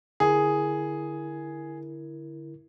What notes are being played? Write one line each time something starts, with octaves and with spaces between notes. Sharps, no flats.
D3 E4 G#4 A#4